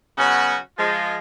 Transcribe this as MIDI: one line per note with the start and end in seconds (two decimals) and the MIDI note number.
0.18 0.57 49
0.18 0.57 54
0.18 0.57 59
0.18 0.57 61
0.18 0.57 66
0.78 1.17 53
0.78 1.17 56
0.78 1.17 65